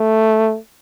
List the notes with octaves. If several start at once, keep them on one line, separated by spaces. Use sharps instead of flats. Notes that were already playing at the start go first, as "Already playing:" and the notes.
Already playing: A3